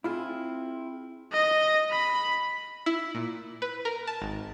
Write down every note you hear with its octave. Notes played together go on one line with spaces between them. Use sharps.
C4 E4 F4 G#4
D#5
B5
E4
A#2
B4
A#4
A5
G#1